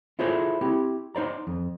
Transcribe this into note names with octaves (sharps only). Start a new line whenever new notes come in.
E4 F4 G#4 A4 C5 D5
C4 E4 G4
D#4 C5 D5 A#5
F2